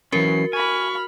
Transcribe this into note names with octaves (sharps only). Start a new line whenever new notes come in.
E3 F#3 C#4 F#4 A#4 C7
G#5 B5 C#6 F6